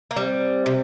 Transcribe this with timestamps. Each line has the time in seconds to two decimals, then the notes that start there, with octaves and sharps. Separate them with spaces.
0.11 A#3
0.16 G3 C4
0.66 C3